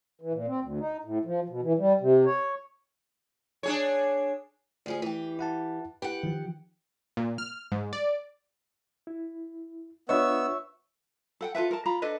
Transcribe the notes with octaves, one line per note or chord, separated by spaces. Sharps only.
E3
A#2
C4
D2
D#4
A2
F3
B2
E3
G3
C3
C#5
D4 G#4 C#5
D2 F3 G#4
E3 G4
E4 F#5 A5
E4 G4 B4 F#5
D#3 F3
A#2
F6
G#2
D5
E4
B3 D4 F4 C#5 D#5 E5 C#6 E6
A4 F#5 G5
F4 A4 B4 E5
A#4 A5
F4 A#5 B5
D4 A4 B4 D#5